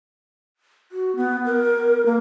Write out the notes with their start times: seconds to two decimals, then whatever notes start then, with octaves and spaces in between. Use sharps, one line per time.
0.92 F#4
1.16 B3
1.46 A#4
2.06 A#3